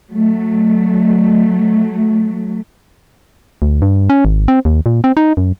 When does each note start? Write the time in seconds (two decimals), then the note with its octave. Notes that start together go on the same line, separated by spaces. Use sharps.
0.12 F#3 A3
3.62 D2
3.82 G2
4.10 C#4
4.25 G#1
4.48 C4
4.65 D#2
4.86 A#2
5.04 C4
5.17 D#4
5.37 F#2